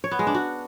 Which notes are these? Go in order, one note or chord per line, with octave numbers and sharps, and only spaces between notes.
C#5
B3
G#3
D4
F#4